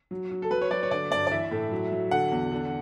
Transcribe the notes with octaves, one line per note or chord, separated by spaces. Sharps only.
F#3
F#3
A4
F#3 B4
C#5
F#3 D5
C#5
D3 D5
G2 D5
D5
E3 E5
A2
F#3
F#3
D3 F#5
E2
D3